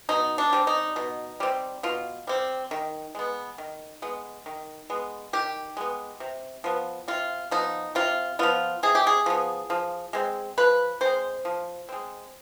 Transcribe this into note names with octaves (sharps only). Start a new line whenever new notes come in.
B2 D#4
D4
G3 C4
D#4
B2
G3 C4
B2 F4
G3 C4
D#3
G#3 B3
D#3
G#3 B3
D#3
G#3 B3
D#3 G4
G#3 B3
C3
F3 B3
C3 F4
F3 B3 D#4
C3 F4
F3 B3 F4
C3 G#4
G4
G#4
F3 B3
F3
G#3 C4
F3 B4
G#3 C4 C5
F3
G#3 C4